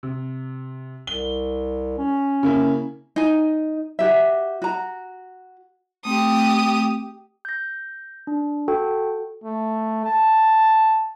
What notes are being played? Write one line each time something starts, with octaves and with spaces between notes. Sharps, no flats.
C3
C2 G7
C#4
C#3 A#3 E4
D#4 G#5
F#4 G4 E5
F#4 A#5
A3 C4 G4 D#6
G6 A#6
D4
F#4 A4 G5
A3
A5